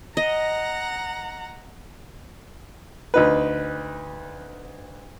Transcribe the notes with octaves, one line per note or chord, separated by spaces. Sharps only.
D#5 F#5 A#5
D2 D#4 B4